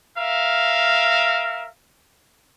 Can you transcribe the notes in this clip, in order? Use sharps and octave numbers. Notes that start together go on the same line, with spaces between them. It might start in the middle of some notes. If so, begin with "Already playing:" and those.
A#4 E5 F5